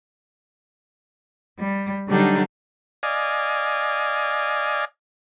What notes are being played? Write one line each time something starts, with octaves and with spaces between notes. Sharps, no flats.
G3
D3 F#3 G3 D4 D#4
D5 D#5 F5 G#5